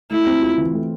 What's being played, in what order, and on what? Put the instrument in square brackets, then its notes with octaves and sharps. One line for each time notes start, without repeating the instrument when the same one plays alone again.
[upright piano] A3 [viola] E4
[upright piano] C4
F4
E3
A3